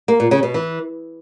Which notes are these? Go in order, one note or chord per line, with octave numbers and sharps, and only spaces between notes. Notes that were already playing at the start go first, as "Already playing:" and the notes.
A#3
A#2
C#3
B2
E3